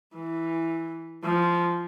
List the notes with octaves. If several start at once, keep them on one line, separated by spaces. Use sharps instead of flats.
E3
F3